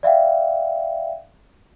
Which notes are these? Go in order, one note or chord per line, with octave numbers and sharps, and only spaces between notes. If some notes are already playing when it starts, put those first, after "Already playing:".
D5 E5 F5 G5